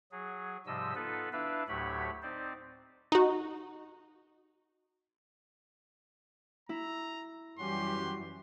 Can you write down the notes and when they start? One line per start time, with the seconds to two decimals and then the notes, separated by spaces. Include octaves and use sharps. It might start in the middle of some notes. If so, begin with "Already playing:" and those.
0.12 F#3 G#4
0.66 G#2 C3 F3 G3 D#5 E6
0.95 B3 D#4 F4 A4 B4
1.33 D4 E4 B4 E5 F5
1.68 D2 A2 F#3 G4 C#5 B5
2.22 C4 D#4 C5 D5
3.12 D#4 F#4
6.69 E4 A#5
7.59 F#2 E3 G3 C#4 F#4 G4 C6